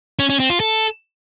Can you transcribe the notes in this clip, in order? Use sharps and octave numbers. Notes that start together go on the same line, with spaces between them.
C#4
C#4
C4
F4
A4